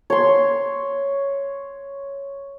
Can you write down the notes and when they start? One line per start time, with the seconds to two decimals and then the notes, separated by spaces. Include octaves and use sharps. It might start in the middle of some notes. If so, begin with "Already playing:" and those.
0.10 C#5 C6